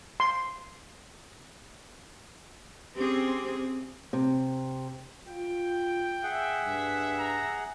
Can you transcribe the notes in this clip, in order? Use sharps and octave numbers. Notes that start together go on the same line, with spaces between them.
C6
C4 C#4 G4 G#4
C3
F4 G5
G#4 E5 F#5
G2
A#5